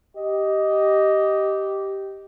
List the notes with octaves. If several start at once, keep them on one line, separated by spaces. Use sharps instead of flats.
G4 D#5